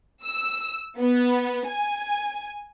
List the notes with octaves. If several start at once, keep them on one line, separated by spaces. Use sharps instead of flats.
E6
B3
G#5